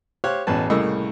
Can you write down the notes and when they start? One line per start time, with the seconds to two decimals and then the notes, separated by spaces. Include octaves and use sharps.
0.24 G4 C5 C#5 F5 F#6
0.47 A1 E2 B2 C#4 B4 A5
0.70 C2 A2 C#3 A#3 D#5 E6